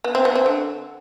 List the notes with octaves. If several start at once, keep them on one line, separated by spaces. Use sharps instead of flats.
B3
C4
B3
C4
D3